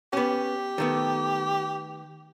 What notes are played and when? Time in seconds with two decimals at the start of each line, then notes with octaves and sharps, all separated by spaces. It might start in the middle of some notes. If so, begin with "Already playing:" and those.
0.13 B3 C#4 G4
0.78 D#3 A3 B3